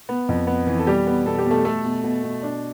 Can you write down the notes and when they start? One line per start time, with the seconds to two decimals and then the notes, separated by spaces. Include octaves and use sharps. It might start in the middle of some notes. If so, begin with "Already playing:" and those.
0.09 B3
0.29 F2
0.47 B3
0.67 E3
0.79 A4
0.87 B2 G3 G4
1.07 B3
1.26 B2 A4
1.39 G4
1.45 B2
1.50 A3 A4
1.65 B2 A3 A4
1.85 B2
2.04 B2
2.23 B2
2.43 D4